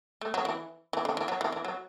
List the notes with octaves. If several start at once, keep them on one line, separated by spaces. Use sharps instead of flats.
A3
F#3
E3
E3
D3
E3
F#3
E3
E3
F#3